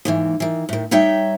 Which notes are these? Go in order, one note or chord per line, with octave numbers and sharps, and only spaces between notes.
D#2 G#2 E3
D#3 E3
A2 D#3
G3 D#4 C#5 E5 G5